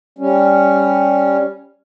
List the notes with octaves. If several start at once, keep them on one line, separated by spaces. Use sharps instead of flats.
G3 C#4